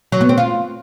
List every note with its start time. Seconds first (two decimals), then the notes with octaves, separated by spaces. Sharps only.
0.12 F#3
0.21 B3
0.29 C4
0.38 F4